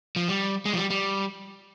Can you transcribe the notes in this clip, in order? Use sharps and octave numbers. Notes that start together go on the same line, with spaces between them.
F3
G3
G#3
F3
G3
G3